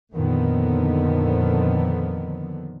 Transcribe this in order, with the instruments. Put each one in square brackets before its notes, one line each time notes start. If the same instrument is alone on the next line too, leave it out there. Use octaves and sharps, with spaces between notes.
[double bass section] F2 A#2 D3 D#3 F3 B3